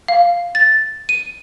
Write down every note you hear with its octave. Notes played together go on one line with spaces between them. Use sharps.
F5
A6
D#7